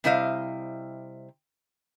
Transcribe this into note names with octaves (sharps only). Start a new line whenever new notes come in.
C3 G3 E4 C5 D#5 F5